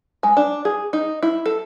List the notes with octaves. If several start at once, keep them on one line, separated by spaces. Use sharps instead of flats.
G#3
D4
G#4
D#4
E4
A4